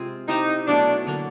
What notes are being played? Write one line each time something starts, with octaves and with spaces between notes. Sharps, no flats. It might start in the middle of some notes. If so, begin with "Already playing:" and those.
Already playing: C3 G#3 C4 F4 G#4
C4 D#4 E4 G4 C5
B2 F#3 A3 D4
D3 F#3 A#3 D4